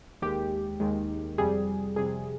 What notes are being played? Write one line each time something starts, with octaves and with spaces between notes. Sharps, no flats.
D#2 D#3 G#3 G4
D#2 D#3 G#3
F2 C3 G3 G#4
F2 C3 G3 G#4